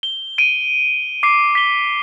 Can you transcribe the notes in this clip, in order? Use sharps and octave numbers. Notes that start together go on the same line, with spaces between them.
G7
D7 D#7
D6 C7
B6 G7